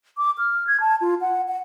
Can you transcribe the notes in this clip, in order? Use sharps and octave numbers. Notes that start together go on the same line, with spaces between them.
D6
F6
G#6
A5
F4
F#5
F#5